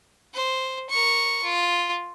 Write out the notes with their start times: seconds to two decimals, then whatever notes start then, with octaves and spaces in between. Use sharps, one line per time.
0.34 C5
0.89 A#4 C#6
1.43 F4